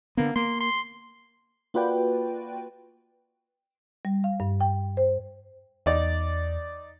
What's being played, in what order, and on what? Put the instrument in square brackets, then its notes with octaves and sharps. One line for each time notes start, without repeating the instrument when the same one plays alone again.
[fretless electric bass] D3 B3 [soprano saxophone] A#3
[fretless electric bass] A#3 [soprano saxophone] C6
[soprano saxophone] C6
[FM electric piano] A#3 F4 F#4 B4 D5 G5
[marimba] G3
F5
G2
G5
C5
[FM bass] E2 [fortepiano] D#4 D5